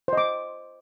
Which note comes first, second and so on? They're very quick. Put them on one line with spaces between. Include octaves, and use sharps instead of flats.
C5 D#5 D6